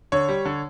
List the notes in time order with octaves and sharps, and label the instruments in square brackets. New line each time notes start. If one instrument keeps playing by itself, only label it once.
[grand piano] D3 C#5
G3
D3